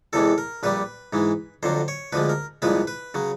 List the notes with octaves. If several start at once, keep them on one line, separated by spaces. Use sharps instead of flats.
E2 C3 E3 G#3 A4
A#4
A#1 A#2 G3 B4
G#2 E3 G#3
F2 D3 F#3 C5
C#5
D2 D3 F3 G#3 B4
A#4
C2 A#2 F3 G#3 B4
B4
C#3 F#3